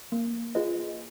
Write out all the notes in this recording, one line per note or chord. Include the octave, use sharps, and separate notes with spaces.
A#3
F4 G#4 B4 D#5